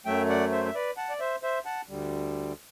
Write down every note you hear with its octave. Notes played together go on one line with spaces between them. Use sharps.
F#2 F#3 A3 E5 G5
D5 F#5
C5 E5
E5
B4 D5
F#5 A5
D5
C5 E5
C5 E5
F#5 A5
D2 D3 G3